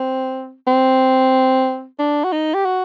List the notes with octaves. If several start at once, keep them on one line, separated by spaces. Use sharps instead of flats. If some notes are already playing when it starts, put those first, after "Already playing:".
Already playing: C4
C4
D4
F#4
D#4
G4
F#4